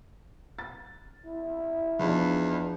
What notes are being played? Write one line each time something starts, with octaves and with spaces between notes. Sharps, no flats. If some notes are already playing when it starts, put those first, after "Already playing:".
A6
E4
E2 F3 D4 D#4